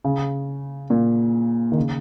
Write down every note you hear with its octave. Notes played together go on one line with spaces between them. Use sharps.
C#3
A#2
D#3
C#3